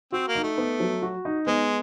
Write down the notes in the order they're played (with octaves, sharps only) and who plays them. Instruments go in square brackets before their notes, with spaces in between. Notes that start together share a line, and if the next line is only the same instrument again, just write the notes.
[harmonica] C4 [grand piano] F#4
[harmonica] A#3
[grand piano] D#4
[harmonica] A3
[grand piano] B3
F#3
F#4
D#4
[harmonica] G#3 [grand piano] B3